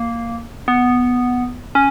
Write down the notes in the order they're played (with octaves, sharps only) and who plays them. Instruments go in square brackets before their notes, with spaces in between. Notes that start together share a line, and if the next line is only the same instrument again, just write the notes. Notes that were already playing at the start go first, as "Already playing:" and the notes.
Already playing: [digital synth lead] A#3
B3
C#4